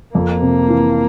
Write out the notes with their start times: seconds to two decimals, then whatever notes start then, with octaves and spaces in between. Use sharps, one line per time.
0.15 F2 A#3
0.42 C3
0.69 E3